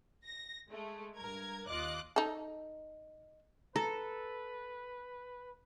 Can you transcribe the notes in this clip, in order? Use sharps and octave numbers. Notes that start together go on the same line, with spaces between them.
A#6
G#3 A3
G2 A#4 G#6
D#2 F4 D#5 D6 F#6
D#4 A4
A4 B4 A#5